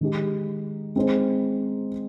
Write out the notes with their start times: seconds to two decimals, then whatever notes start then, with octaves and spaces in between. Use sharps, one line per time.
0.01 D#3 G#3 D#4 G4
0.96 G#3 C4 D#4 G#4 C5